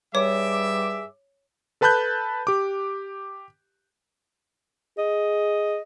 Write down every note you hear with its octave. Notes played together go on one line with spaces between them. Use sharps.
G2 G3 G#4 C#5 E5 D6
A4 B4 A5 B5 F#6 G6
G4 D6
G#4 D#5